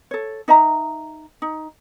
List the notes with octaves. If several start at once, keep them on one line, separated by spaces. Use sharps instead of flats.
A4 C#5
D#4 D#5 E5 A#5
D#4